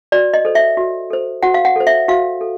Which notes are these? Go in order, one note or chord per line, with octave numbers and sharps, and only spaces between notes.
F#4 D5
D#5
A4 C5
E5
F#4
A4 C5
F#4 F#5
F5
F#5
A4 C5
E5
F#4 F5
A4